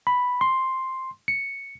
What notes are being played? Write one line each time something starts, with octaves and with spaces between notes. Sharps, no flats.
B5
C6
C#7